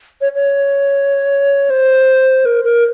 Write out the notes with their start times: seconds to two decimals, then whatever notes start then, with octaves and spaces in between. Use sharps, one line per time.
0.21 C#5
0.35 C#5
1.70 C5
2.45 A#4
2.64 A#4